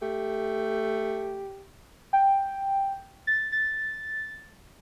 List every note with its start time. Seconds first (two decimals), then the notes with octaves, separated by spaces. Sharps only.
0.02 A3 G4
2.13 G5
3.27 A6
3.52 A6